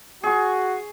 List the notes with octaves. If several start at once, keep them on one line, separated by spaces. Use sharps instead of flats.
F#4 G#4 C#6